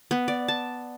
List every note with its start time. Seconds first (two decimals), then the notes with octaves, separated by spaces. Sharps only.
0.11 B3
0.28 D5
0.48 A5